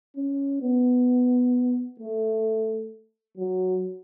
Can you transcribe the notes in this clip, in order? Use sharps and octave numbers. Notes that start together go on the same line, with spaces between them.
C#4
B3
A3
F#3